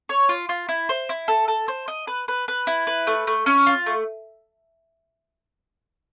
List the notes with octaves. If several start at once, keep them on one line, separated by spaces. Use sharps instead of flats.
C#5
F4
F4
E4
C5
E4
A4
A4
C5
D#5
B4
B4
B4
E4
B4
A3
A3
C#4
F4
A3